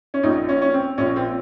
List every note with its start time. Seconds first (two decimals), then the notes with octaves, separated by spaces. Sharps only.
0.14 C#4
0.23 A#1 A#2 F3 D#4
0.49 C#4
0.62 C#4
0.74 C4
0.98 A#1 A#2 F3 C#4
1.16 C4